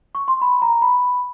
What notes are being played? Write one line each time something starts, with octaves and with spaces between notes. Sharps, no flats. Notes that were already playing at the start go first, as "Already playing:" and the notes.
C#6
C6
B5
A#5
B5